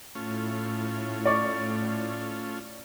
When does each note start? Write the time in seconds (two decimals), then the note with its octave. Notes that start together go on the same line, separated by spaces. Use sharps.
0.15 A2 A3 C#4 F4
1.26 D5 C#6